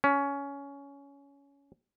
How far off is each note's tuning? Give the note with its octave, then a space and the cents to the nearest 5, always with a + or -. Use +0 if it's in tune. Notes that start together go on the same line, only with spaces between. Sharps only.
C#4 +15